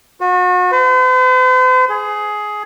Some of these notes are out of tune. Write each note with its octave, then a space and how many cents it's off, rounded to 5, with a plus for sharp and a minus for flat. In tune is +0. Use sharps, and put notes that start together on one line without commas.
F#4 -35
C5 -45
G#4 +15